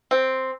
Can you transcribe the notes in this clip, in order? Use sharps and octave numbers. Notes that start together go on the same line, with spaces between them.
C4